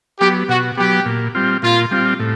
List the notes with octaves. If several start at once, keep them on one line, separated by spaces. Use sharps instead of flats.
F#3 B3 G4
B2 F#4
F#3 B3 G4
A#2
G3 C4 F4
A#2 F4
G3 C4 F4
A2